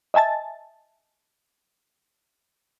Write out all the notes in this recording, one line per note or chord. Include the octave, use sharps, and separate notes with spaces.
D#5 E5 G#5 A5 A6